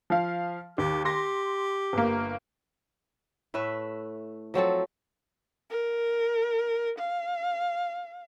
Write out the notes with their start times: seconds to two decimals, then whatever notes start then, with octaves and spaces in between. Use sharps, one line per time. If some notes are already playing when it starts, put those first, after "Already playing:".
0.10 F3 F5
0.78 D#2 G4
1.05 G4 C6 A#6
1.93 G1 A#3
3.54 A2 A3 B4 E5
4.54 F3 F#3 C4 A4
5.70 A#4
6.99 F5